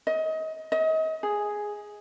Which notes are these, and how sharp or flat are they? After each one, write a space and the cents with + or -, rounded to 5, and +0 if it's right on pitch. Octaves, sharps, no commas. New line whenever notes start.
D#5 +30
D#5 +35
G#4 +0